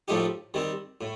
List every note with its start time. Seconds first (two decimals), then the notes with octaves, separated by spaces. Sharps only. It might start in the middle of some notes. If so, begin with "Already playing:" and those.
0.08 A2 F3 A3 D#4 G4
0.54 D#3 G3 C4
1.01 A2